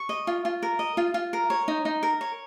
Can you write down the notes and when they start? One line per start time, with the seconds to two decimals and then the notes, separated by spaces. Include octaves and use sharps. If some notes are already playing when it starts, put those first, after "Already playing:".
Already playing: C#6
0.09 D#5
0.27 F4
0.45 F4
0.63 A#4
0.79 D#5
0.97 F4
1.14 F4
1.33 A#4
1.50 C#5
1.68 D#4
1.85 D#4
2.03 A#4
2.21 C#5